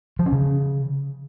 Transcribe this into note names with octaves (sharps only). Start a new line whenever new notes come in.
F3
C#4
C#3